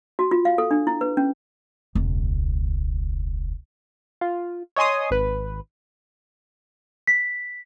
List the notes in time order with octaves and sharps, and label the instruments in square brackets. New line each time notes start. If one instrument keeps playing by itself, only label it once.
[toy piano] F#4
F4
F5
A4
D4
E4
B4
C#4
[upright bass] E1 C#2
[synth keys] F4
C#5 D#5 G#5 C6 D#6
G#1 B4
[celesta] B6